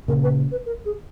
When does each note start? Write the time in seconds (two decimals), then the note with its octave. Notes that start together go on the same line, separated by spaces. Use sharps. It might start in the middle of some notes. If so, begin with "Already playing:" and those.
0.08 A#2 C#3 A#4
0.23 B4
0.51 B4
0.66 A#4
0.85 G#4